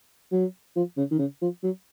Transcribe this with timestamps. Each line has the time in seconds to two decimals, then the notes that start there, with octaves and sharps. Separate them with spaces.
0.32 F#3
0.76 F3
0.97 C#3
1.11 D#3
1.19 C#3
1.41 F3
1.63 F#3